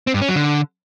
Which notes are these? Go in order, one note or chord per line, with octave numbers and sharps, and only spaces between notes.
C4
G2
C#4
F#3
D3